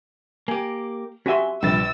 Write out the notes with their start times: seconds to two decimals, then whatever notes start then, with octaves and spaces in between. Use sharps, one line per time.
0.48 A#3 G4 G#5
1.26 C#4 F#4 G4 E5 G#5 C6
1.63 A#1 C3 G3 B4 E6 A6